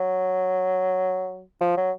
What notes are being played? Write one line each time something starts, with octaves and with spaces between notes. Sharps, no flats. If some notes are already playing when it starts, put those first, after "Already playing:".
Already playing: F#3
F3
F#3